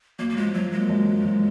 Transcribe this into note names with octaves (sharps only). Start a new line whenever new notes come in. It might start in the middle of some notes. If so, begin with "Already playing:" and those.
F#2 A#3
A#3
F3 G#3
F#2 F#3
G#3 A#3
F#2
F3
F#2